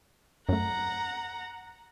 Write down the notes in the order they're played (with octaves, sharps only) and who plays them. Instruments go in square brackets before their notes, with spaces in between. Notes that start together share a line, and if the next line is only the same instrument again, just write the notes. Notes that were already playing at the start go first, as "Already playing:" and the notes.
[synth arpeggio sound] F#2 A3 [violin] F#5 A#5